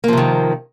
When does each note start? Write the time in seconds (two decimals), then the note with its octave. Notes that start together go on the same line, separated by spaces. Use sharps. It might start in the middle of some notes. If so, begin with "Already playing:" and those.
0.04 A#3
0.08 F3
0.13 C3
0.17 D#3